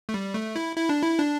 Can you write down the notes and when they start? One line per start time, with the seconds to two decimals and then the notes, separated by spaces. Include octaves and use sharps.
0.09 A3
0.14 G3
0.34 A3
0.56 E4
0.77 E4
0.89 D4
1.03 E4
1.19 D4